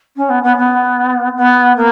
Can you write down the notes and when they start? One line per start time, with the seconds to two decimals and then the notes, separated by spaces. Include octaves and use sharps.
0.16 C#4
0.29 B3
0.43 B3
0.56 B3
1.36 B3
1.76 A#3